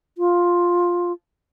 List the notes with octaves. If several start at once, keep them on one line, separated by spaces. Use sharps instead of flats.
F4